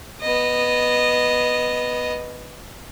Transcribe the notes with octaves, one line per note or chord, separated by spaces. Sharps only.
B3 D#5